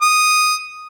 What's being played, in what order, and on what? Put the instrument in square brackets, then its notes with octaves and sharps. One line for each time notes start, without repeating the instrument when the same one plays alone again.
[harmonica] D#6